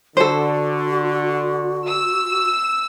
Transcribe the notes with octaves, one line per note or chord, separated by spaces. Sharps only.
D3 F#4 A4 C5
E6